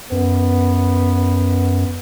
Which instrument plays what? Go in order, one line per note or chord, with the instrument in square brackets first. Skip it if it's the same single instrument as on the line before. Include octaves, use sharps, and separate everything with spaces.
[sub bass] F#2 [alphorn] B3